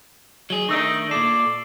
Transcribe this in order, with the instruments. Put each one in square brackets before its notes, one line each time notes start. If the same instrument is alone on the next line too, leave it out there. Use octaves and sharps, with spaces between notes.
[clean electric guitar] F#3 G#4 [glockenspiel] G7
[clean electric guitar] D#3 A3 D4 [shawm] D#4 [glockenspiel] C#6 E6 D7
[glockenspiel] F#7
[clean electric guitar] A#2 A4 [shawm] D5 [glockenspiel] C7